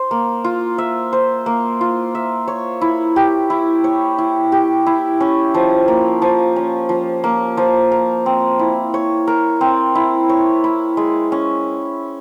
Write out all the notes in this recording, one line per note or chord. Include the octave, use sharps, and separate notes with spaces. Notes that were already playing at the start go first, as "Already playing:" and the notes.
Already playing: C5
A#3
F4
E5
C5
A#3
F4
E5
C#5
E4
G4
E4
C#5
E4
G4
E4
C#4
F3
A#3
F3
C#4
F3
A#3
F3
A#4
C4
E4
C#5
A#4
C4
E4
C#5
E4
G#3
C#4